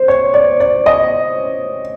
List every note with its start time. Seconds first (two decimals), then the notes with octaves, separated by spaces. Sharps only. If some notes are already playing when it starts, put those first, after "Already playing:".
Already playing: C5
0.08 C#5
0.34 D5
0.60 D5
0.86 D#5